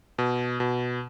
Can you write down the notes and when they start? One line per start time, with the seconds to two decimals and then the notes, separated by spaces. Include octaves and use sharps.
0.18 B2
0.60 B2